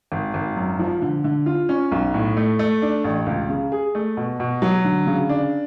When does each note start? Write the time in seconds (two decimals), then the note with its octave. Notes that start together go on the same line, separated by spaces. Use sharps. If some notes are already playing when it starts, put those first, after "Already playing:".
0.12 G#1
0.34 G#1
0.56 F#2
0.79 F3
1.02 D3
1.24 D3
1.46 F4
1.69 C#4
1.92 B1
2.14 A2
2.37 A3
2.59 A3
2.82 D4
3.04 A1
3.26 C#2
3.49 C#3
3.72 G#4
3.95 A3
4.17 B2
4.40 B2
4.62 F#3
4.84 D3
5.07 C#3
5.29 D4